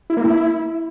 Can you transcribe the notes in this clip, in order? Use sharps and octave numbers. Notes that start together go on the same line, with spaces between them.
E4
A#3
E4